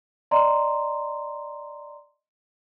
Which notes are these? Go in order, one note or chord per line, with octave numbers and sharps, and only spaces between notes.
D5 D#5 A#5 C6